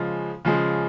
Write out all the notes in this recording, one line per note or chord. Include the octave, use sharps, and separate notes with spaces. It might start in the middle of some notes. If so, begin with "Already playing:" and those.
Already playing: C#3 F3 G#3
C#3 F3 G#3